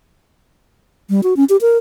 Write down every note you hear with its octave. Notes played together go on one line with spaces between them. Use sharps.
G3
F#4
C#4
G4
A#4